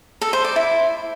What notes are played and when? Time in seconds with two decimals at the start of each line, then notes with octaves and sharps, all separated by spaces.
0.21 A4
0.33 C5
0.45 D5
0.56 E4